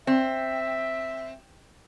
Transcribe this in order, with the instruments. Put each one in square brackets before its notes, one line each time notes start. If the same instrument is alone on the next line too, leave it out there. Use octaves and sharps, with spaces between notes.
[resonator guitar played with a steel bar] C4 [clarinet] E5